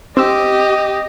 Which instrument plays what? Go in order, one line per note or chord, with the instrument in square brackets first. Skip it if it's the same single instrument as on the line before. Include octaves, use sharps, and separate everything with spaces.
[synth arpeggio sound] C4 E6 [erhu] G4 [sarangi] D#5